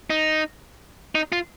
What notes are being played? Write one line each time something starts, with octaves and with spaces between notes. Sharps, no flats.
D#4
D#4
F4